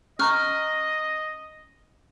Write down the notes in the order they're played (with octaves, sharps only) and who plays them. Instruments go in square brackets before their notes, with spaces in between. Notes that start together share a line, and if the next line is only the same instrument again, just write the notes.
[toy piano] C#4 A#5 [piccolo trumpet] D#5 [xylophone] C#6 F6 F#6